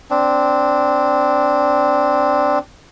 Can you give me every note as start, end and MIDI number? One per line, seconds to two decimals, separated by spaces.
0.11 2.59 60
0.11 2.59 62